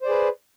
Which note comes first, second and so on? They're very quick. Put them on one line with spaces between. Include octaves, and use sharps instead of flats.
C5 D5 G#4 B4